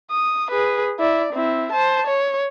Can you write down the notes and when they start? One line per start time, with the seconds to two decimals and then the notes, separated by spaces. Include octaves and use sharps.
0.11 D#6
0.51 G#4 B4
0.99 E4 D5
1.33 C4 E4
1.72 C5 A5
2.07 C#5